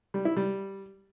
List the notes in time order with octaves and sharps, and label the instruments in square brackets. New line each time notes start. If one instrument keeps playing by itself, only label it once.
[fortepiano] G3
E4
G3